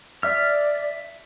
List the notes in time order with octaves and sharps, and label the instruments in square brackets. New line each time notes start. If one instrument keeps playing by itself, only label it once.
[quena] D5 [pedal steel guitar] E5 F6